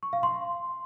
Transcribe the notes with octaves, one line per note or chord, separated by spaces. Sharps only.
C#6
F5
C6